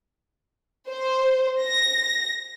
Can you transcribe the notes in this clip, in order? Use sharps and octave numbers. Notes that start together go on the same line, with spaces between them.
C5
A#6